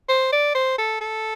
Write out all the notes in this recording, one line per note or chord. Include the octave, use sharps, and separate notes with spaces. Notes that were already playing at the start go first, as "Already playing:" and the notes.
C5
D5
C5
A4
A4